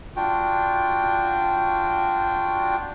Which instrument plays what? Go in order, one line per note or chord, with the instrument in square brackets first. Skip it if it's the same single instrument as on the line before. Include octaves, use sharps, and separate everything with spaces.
[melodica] D4 F4 F#4 G5